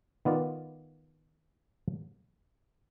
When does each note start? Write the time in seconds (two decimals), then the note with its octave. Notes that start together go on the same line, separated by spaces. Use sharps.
0.25 D#3 B3 F4 D5